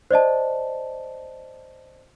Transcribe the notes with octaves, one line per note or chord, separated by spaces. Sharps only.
C5 D5 D#5 A5